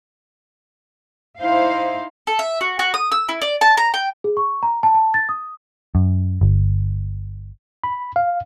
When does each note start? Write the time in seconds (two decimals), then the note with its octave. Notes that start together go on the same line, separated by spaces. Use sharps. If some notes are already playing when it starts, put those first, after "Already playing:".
1.39 D#4 E4 C5 F5
2.27 A4
2.39 E5
2.61 F#4
2.79 F#4
2.94 D#6
3.12 E6
3.29 E4
3.42 D5
3.61 A5
3.77 A#5
3.94 G5
4.24 G#4
4.37 C#6
4.63 A#5
4.83 A5
4.95 A5
5.14 A6
5.29 D#6
5.95 F#2
6.41 G1
7.84 B5
8.16 F5